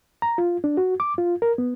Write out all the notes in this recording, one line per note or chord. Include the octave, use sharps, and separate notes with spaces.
A#5
F4
D4
F#4
D6
F4
A#4
B3